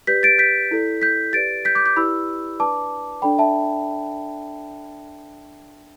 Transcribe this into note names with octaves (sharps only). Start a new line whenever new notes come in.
G4 B4 D5 G6 B6
A6 D7
G6 B6
E4 A4 D5
G6 B6
G4 B4 D5 A6 D7
G6 B6
D6 G6
D6 G6
E4 G4 B4 D5 B5 E6
D4 B4 D5 A5 D6
D4 A4 D5 G5 B5
E5 A5